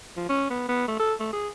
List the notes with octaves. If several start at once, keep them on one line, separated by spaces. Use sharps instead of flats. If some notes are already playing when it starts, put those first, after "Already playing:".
F3
C#4
B3
B3
A3
A4
A3
G#4